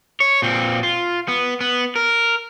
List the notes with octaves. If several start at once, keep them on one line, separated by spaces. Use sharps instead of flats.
C#5
A#2 C4
F4
B3
B3
A#4